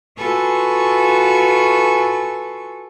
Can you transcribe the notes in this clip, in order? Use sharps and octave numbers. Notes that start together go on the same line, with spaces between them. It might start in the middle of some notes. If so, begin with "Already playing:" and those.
F4 F#4 A4 B4 G#5 C#6